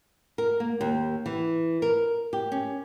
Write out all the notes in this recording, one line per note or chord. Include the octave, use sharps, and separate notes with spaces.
A#4
A#3
D#2
E3
A#4
G4
C#4